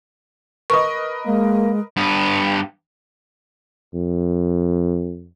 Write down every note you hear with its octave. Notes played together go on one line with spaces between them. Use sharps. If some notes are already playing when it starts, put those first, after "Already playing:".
A#4 B4 D#5 C#6
G#3 A#3
G2 B3
F2